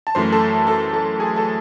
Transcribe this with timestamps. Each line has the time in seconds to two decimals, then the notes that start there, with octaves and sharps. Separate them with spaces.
0.07 A5
0.15 F#2 E3 A3 C5 C6
0.32 A4 A5
0.67 A4 A5
0.93 A4 A5
1.20 G#4 G#5
1.36 A4 A5